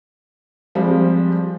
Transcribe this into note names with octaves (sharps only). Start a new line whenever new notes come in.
F3 G3 G#3 C4